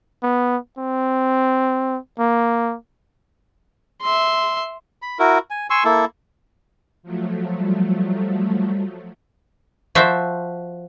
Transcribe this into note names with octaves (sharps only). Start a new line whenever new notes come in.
B3
C4
A#3
E5 C6
B5
E4 F#4 A#4
G#5
G#5 C6 C#6 E6
A#3 E4 A4
F3 F#3 A3
G3
F3 F#4 C5 E5